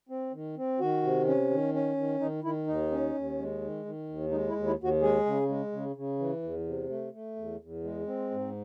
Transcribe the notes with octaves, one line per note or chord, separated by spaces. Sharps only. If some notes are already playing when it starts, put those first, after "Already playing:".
C4
D#3
C4
D#3 F#4
C3
C#4
D#3
C#4
D#3
D#3 D#4
D#3 E4
D#2 D#4
C#4
D#2
G#3
D#3
D#3
D#2
G#3 D#4
E4
D#2
E4
D#2
F#4
G#3 G#4
C#3
G#3
C#3
C#3
E3
E2
C3
A3
A3
E2
E2
G#3
C4
G#2